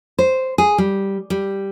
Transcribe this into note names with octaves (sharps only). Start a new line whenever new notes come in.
C5
G#4
G3
G3